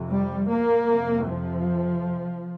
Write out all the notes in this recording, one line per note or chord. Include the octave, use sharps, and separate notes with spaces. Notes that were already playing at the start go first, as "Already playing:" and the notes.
Already playing: F2 C3
G3
A#3
F2 C3
F3